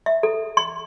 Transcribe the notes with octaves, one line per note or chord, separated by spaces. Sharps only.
E5
A4
C6